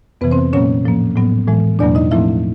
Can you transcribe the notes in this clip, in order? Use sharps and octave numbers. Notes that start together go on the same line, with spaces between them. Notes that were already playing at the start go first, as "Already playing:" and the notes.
F2 C3 E3 B3 B4
C4 C5
A#2 F#3 A#3 C#4 C#5
A2 F3 A#3
A2 F#3 B3
A2 E3 G#3
E2 B2 F#3 A#3 D4 D5
D#4 D#5
A2 F3 A3 C4 E4 E5